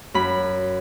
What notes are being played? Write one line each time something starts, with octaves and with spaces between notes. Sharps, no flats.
F#2 B5